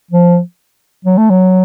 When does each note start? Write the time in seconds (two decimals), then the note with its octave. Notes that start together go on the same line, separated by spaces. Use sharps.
0.11 F3
1.05 F#3
1.18 A3
1.30 F#3